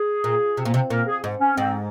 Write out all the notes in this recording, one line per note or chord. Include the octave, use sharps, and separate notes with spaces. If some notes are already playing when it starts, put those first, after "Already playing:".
Already playing: G#4
A#2
C3
A#2
C3
A#2 A#4
G#4
G#2
C#4
G#2 C4